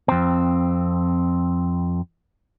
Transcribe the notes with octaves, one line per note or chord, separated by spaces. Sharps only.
F2 C4